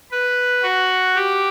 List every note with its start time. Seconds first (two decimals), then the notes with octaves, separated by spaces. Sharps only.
0.11 B4
0.63 F#4
1.15 G4